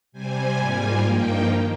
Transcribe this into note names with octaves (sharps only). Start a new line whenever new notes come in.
C3 G3 C4 G#5
G#2 G3 A#3 F4 G#5
G2 F3 A#3 D#4 G5
D#3